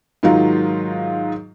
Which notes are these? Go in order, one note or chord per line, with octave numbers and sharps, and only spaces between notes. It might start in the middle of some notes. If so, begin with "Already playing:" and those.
G#2 D#3 F#3 D#4 F4